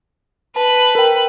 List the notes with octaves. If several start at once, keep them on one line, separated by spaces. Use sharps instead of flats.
B4 A5
A#4 G5